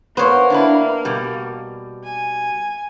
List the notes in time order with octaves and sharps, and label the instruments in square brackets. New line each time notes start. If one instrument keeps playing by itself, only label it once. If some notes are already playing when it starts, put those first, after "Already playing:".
[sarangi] A#3 [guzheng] B3 C#5 [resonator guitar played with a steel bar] C5
[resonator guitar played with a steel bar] D4 E4 B4
B2 G3
[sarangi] G#5